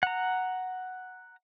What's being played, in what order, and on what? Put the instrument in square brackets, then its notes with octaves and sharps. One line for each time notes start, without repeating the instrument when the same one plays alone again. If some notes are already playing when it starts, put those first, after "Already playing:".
[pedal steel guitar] F#5 A#5